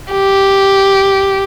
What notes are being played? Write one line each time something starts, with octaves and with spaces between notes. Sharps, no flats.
G4